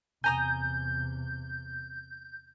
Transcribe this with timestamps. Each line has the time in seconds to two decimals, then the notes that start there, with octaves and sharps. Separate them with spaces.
0.24 E2 C3 G#5 A#5 D#6 G6